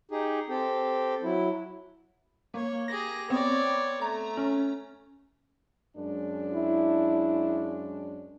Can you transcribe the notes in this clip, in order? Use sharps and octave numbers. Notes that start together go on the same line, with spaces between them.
D#4 G4 G#4
C4 G4 A4
F#3 E4
A#3 C#5
G4 G#4 A#6
B3 C4 C#5 D5
A3 A#5
C#4
F#2 G#3 D4
E4